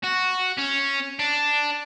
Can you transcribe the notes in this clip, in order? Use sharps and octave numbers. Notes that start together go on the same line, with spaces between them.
F#4
C#4
D4